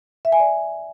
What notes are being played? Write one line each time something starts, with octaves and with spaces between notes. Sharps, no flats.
E5
G#5
D5